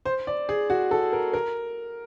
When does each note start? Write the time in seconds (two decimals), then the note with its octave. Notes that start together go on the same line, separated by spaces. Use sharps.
0.06 C5
0.27 D5
0.49 G#4
0.70 F#4
0.91 A4
1.13 A#4
1.33 A#4